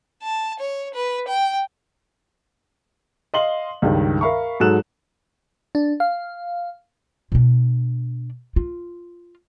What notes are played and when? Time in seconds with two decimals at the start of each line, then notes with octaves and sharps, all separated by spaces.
0.23 A5
0.59 C#5
0.94 B4
1.28 G5
3.34 D#5 F5 C6 F#7 G7
3.82 C#2 G2 D#3
4.21 A#4 E5 F5 B5 C#6
4.60 G#2 F#3 A4 F#6 E7
5.75 D4
6.00 F5
7.32 B2 D4
8.56 F4